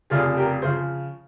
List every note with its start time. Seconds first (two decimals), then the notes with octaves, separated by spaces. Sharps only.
0.10 F1 F2 C#3 F4 G#4
0.37 G4 A#4
0.62 C#3 F3 G#4 C5